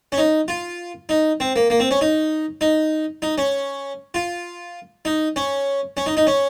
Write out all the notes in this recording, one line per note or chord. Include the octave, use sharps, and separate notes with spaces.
C#4
D#4
F4
D#4
C4
A#3
A#3
C4
C#4
D#4
D#4
D#4
C#4
F4
D#4
C#4
C#4
D#4
D#4
C#4